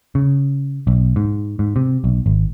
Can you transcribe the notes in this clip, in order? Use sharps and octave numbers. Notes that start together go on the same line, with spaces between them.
C#3
B1
G#2
G#2
C3
B1
G#1